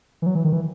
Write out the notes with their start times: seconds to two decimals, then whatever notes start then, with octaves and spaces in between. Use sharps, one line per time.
0.22 E3
0.26 F#3
0.35 E3
0.45 D#3
0.53 E3